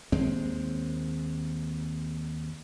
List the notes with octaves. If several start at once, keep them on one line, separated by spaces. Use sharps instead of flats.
D#2 G#3 C4